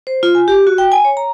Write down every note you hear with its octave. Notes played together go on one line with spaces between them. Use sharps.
C5
F4
G#5
G4
F#4
G5
G#5
C#5
A#5